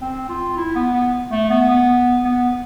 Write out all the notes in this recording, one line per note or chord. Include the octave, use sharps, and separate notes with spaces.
C4
F4
E4
B3
B3
A3
B3
B3
B3